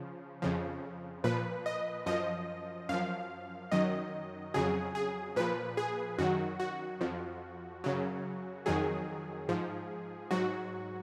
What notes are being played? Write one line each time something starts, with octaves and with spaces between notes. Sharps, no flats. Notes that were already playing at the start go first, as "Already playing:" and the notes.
Already playing: C#3 F3
F2 C#3 F3
A#2 F3 B4
D#5
F#2 F3 D#5
F#2 F3 F5
F#2 D#3 F#3 D#5
F2 C#3 F#3 G#4
G#4
A#2 F3 B4
G#4
F#2 D#3 F#3 F#4
F#4
F2 F3
F#2 C#3 F#3
F2 D#3 F#3 G#4
G#2 F3
G#2 F#3 F#4